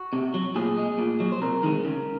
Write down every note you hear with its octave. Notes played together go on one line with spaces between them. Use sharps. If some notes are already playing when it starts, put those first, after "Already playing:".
Already playing: F#4
C3
F#3
A#2 G#4
G#3
A#2
F#3
C5
C3 A#4
D#3 G#3
C#3